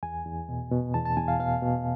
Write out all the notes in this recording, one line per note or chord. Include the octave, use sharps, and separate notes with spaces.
E2 G#5
E2
B2
B2
E2 A5
A5
E2 G#5
F5
B2 F5
B2